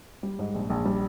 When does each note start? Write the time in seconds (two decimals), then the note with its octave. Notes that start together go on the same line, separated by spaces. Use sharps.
0.23 G3
0.39 G#2
0.54 A#1
0.70 A#1
0.85 G3